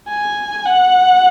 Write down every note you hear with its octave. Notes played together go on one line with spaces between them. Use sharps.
G#5
F#5